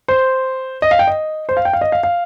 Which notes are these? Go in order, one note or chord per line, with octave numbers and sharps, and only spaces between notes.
C5
D#5
F5
G5
D#5
C5
F5
G5
F5
D#5
F5
F5